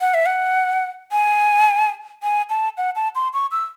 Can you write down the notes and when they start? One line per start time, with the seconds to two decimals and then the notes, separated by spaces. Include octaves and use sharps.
0.01 F#5
0.14 E5
0.26 F#5
1.12 G#5
2.23 G#5
2.50 A5
2.78 F#5
2.96 A5
3.15 C6
3.34 C#6
3.52 E6